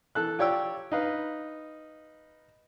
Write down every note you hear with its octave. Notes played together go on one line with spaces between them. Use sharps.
E3 A4 F#6
F4 G4 C#5 D5 G5 E6
D#4 B4 F5